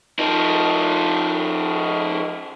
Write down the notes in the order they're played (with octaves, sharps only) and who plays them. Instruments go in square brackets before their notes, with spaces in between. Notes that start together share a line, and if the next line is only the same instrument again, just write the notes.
[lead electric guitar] F3 D#4